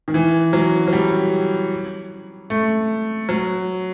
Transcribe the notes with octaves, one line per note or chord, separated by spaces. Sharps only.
D#3
E3
F#3
F#3
G3
A3
F#3